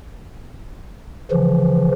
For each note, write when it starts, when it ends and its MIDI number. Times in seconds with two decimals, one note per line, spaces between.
1.31 1.91 49
1.31 1.91 52
1.31 1.91 53